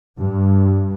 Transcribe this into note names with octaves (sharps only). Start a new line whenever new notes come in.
G2